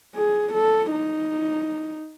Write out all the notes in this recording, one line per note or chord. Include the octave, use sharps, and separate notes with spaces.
G#4
A4
D#4